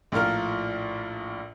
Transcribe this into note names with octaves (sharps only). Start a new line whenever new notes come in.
A#1 A2 F4 A#4 F6